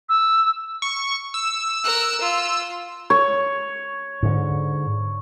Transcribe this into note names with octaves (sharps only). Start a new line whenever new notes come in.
E6
C#6
E6
A#4 F#6
F4
C#5
G#2 D3